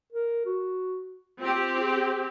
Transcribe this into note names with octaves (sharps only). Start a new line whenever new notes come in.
A#4
F#4
C4 F4 G4
G#4